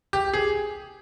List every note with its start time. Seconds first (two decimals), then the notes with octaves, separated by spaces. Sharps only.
0.13 G4
0.34 G#4